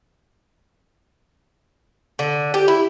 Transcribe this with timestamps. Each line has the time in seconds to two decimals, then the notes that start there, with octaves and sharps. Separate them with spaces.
2.19 D3
2.54 G4
2.68 E4